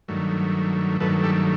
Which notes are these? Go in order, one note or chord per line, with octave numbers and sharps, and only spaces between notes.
G2 D#3 F#3 A3
G2 D#3 F#3 A3 A4 B4
G4 A4